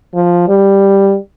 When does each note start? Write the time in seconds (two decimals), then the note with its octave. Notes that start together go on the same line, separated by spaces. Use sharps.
0.15 F3
0.48 G3